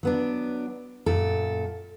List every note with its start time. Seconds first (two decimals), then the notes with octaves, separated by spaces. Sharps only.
0.03 F#3 B3 D4
1.06 F#2 A#2 A4